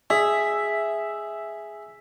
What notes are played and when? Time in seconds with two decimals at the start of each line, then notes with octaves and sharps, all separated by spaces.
0.10 G#4 E5